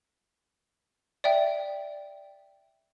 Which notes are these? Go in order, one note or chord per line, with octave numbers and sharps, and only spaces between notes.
D5 E5 G5